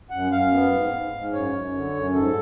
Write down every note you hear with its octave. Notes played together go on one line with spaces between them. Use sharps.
F#2 F#5
F#2 F5
B3
G#2
G#2
G#2
F#2 C#5
F#2
D3
F#2
G#2 A4